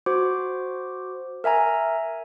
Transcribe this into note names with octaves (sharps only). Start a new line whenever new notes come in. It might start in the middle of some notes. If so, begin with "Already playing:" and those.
F#4 C5 D6
A#4 E5 G#5 A#5